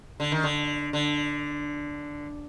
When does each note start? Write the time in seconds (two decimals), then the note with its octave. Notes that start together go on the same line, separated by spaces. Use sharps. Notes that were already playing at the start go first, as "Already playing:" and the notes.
0.20 D3
0.32 D#3
0.44 D3
0.93 D3